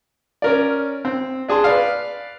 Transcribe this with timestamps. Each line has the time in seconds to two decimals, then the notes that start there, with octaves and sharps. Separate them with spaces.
0.42 C#4 A#4 D5
1.05 C4
1.49 D4 G#4 A5 C6
1.64 B4 D5 F5